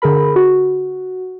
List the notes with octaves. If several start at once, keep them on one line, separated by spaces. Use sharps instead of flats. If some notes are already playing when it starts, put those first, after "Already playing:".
D3 G#4 A#4 B5
F#4